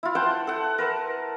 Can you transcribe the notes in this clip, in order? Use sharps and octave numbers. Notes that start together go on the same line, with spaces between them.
E4 F4
C5 F#5 G5 A5
A4 F#5
A#4 B4 A5